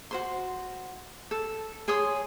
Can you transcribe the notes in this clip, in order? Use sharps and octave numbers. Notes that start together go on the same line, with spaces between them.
F#4 C5 C6
A4
G#4 C#5 C6 D#6